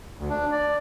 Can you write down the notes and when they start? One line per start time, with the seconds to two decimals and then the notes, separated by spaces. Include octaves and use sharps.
0.18 D2
0.30 D4
0.52 D5